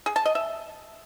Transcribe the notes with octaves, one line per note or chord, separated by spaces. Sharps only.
G#4
A5
D#5
E5